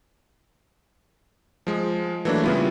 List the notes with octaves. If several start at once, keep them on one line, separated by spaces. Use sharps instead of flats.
F3 G#3
E3 F#3 A3 A#3 D4
C#3 G3 B3 E4 F4